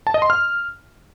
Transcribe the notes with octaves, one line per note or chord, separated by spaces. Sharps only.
A5
D#5
C6
F6